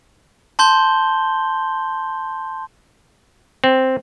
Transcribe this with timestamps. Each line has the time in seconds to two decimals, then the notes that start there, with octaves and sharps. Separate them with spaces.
0.59 A5 C6 G6 G7
3.64 C4